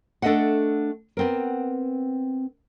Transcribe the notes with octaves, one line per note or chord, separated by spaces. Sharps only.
A3 D4 A4 D#5 E5 F#5
B3 C4 A#4